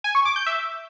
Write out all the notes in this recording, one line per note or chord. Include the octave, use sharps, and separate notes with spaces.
G#5
C#6
D6
G6
E5